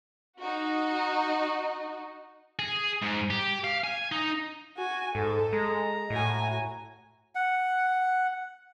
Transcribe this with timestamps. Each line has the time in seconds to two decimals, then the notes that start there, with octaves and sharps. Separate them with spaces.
0.38 D#4 F#4
2.59 G#4
3.03 G#2
3.30 G4
3.64 F5
3.84 G#5
4.12 D#4
4.77 F#4 G#5
5.15 G#2 A4
5.53 G#3 A#5
6.10 A2 F#4 G#5
7.35 F#5